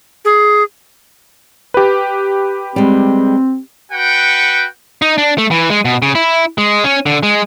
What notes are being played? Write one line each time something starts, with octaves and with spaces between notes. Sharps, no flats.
G#4
G4 B4
G3 G#3 C4
F#4 B4 F#5 G5
D#4
D4
A3
E3
G#3
B2
C#3
E4
G#3
C#4
D3
G#3